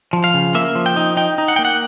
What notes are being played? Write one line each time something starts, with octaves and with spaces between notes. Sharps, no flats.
F3
F5
C#3
A#3 E5
F3
G5
D#4
D#4 G5
D#4
F#5
A#3 G5
F#5